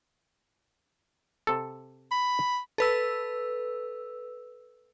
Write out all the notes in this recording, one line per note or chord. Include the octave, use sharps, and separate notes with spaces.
C3 A4
B5
A4 B4 E6